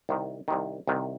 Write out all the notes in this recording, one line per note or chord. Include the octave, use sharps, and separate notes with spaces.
C2 C3 D#3
C2 C3 D#3
C2 C3 D#3